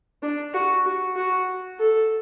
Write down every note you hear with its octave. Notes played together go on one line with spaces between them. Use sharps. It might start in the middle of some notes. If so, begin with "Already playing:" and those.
D4
F#4
F#4
F#4
A4